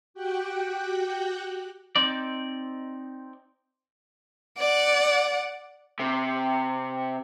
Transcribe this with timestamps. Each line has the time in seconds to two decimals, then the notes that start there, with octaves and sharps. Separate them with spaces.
0.14 F#4 G4 G5 F#6
1.96 C4 D#4 D5
4.58 D5 F#5
5.99 C3